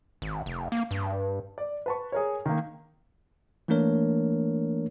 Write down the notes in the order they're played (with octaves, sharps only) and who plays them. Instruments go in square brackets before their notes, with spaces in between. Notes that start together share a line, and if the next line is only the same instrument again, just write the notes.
[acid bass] G#1
F1
A#3
G2
[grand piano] D5
B4 A5 C#6
G#4 A#4 C#5
D#3 A#3
[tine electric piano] E3 A3 A#3 D4 A#4 C#5